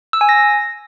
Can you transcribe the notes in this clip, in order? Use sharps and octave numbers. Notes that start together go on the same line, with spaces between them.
E6
G#5
A#6